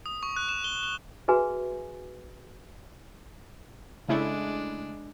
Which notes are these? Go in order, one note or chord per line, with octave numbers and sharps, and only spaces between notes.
D#6
C#6
F#6
E7
G7
G7
F#4 G#4 B4 E5 G#5
C#3 G#3 A3 D4 E4